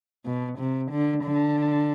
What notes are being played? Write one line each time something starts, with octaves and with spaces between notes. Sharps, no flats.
B2
C3
D3
D3